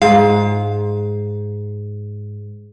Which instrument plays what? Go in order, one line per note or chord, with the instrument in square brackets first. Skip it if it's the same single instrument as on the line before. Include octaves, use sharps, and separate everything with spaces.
[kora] G#2 [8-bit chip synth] F5